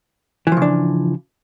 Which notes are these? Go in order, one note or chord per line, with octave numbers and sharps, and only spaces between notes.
C#3 E3 F3 D4